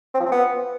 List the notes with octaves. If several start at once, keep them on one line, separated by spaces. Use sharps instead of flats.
C4
F3
C4
B3